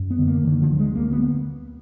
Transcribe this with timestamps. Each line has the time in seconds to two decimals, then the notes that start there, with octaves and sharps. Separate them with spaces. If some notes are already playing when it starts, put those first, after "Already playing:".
Already playing: F#2
0.10 B3
0.19 D3
0.27 A#3
0.44 D3 D#3
0.62 F3
0.70 D2
0.79 G#3
0.95 D2 A#3
1.12 B3